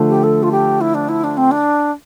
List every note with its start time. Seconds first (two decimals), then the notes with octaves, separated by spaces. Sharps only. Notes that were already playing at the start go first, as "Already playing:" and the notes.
Already playing: D3 F3 A3
0.09 G4
0.23 A4
0.43 F4
0.51 G4
0.81 E4
0.94 D4
1.09 E4
1.24 D4
1.37 C4
1.51 D4